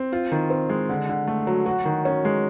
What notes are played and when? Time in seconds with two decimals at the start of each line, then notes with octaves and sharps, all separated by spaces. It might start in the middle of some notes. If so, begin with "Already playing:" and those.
Already playing: C4
0.12 F4
0.32 D#3
0.50 C4
0.69 G#3
0.89 D3
1.09 D3
1.27 A3
1.47 F#3
1.66 F#4
1.85 D#3
2.05 C#4
2.25 G#3